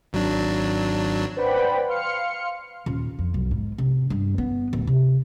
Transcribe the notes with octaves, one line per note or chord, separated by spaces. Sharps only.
G#1 F#3 D4
B4 C5 D5 F#5 G5 B5
F5 C6 F6 C#7
D#1
F2
B1
G#2
C3
G2
B3
D1
C3